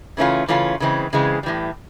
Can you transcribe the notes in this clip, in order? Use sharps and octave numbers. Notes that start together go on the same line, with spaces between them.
C#3 E3 A3 C#4 F4
C#3 E3 A3 C#4 F4
C#3 E3 G#3 C4
C#3 E3 G#3 C4
A2 E3 G3